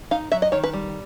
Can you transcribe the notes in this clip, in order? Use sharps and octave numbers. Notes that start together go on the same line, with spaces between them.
D#4 F5
F#3 E5
D#5
D#3 C#5
B4
G3